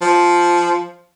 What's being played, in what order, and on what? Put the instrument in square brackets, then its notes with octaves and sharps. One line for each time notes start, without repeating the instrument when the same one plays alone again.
[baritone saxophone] F3